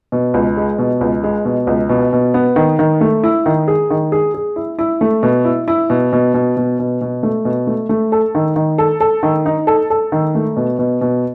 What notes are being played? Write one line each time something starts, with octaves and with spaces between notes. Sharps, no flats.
B2
C#2
G#3
B2
C#2
G#3
B2
C#2
B2
B2
B3
D#3
D#3
A3
E4
D#3
G#4
D#3
G#4
G#4
E4
E4
A3
B2
E4
E4
B2
B2
B2
B2
B2
B2
A3
B2
A3
A3
A4
D#3
D#3
A4
A4
D#3
D#4
A4
A4
D#3
A3
B2
B2
B2